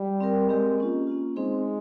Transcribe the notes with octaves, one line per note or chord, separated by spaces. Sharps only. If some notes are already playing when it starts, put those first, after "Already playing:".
Already playing: G3
C4 G4 A#4
G#3 C4 G4 A#4
A#3 C#4 F4
A#3 C#4 F4
G#3 C4 D#4 G#4 C5